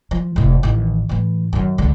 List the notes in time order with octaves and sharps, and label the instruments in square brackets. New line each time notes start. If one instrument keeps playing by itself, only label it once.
[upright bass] F3
F1 A2
A1 D#3
A2 E3
F#2 D#3
C#2 D3